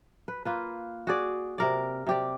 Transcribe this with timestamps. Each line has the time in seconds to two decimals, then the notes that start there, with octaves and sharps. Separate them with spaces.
0.28 B4
0.45 A#3 F4 B4
1.07 F#4 G#4 D5
1.58 C3 A#4 D5
2.07 C3 G4 D5